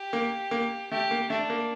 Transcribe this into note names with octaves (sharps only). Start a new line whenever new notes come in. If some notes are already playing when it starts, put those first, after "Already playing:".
Already playing: G4
A#3
A#3
A3 G4
A#3
A3 D4
A#3